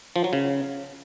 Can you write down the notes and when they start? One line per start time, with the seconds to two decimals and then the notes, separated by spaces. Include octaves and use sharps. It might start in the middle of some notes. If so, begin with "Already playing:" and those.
0.16 F3
0.24 F#3
0.33 C#3